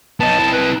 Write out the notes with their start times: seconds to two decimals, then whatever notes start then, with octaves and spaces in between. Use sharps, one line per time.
0.20 B3 D#4 A5
0.39 C4 E4
0.53 B4